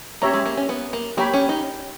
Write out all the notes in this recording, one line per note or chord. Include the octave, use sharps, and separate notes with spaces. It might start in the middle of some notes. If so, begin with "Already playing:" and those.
A#3 C#4 G4 C#5 E5 A#5
G#3
A#3
C#4
B3
A#3
A#3 G4 C#5 G5 B5
C#4
D#4